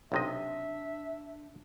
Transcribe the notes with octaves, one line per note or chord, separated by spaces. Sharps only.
B1 C3 D4 D#5 E5